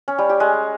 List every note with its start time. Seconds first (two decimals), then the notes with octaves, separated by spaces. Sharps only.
0.08 C#4
0.19 G3
0.29 G4
0.40 G#3